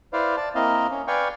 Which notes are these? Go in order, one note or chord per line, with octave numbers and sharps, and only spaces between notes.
E4 B4 C5 D5 F5
D5 A5
A#3 C4 E4 D#5 F5
C#4
B4 D5 F5 G5 G#5 C#6